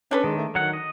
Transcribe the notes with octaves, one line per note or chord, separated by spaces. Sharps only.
C#4 D4 A4 B4
D#3 G#3
A3
D#3 F#3 F#5
D#5